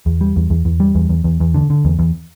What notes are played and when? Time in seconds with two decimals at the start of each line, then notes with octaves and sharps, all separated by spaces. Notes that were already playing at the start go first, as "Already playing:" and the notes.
0.06 E2
0.21 G3
0.36 E2
0.50 E2
0.65 E2
0.80 G3
0.95 E2
1.09 E2
1.24 E2
1.40 E2
1.54 D3
1.70 D3
1.85 E2
1.99 E2